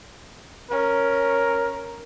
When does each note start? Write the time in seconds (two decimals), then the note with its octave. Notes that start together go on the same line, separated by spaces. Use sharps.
0.71 C#4 A#4